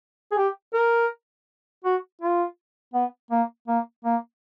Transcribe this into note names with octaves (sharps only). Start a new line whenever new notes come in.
G#4
G4
A#4
F#4
F4
B3
A#3
A#3
A#3